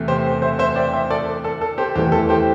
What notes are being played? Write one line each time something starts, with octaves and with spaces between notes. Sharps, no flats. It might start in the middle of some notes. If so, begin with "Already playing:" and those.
Already playing: E2 C3 A3
G4 C5
C5 E5
C5 E5
D5 G5
C5 E5
A4 D5
A4
A4
G4 C5
E2 E3 A3 G4
A4
G4 C5